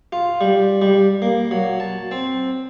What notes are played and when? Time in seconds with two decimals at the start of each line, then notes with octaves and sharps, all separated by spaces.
0.12 F4
0.41 G3
0.82 G3
1.22 A#3
1.51 F#3
1.80 A5
2.11 C4